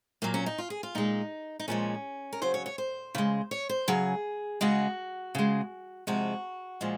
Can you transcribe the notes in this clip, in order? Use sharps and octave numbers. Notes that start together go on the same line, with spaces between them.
A#2 F#3 A#3
C#4
D#4
F4
G#4
F4
A#2 G#3 D#4
D#4
A#2 F3 G#3 C#4
A#4
C#3 F#3 C5
C#5
C#5
C5
C#3 G#3
C#5
C5
C#3 F#3 G#4
C#3 G#3 F#4
C#3 G#3
C3 F3 G#3 F#4
A#2 F3 G#3